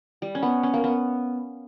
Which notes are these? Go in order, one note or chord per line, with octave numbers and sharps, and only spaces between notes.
G3
C#4
B3
C#4
A#3
B3